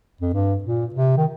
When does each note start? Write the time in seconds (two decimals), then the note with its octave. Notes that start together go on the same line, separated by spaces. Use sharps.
0.21 F2
0.33 G2
0.64 A#2
0.94 C3
1.17 D#3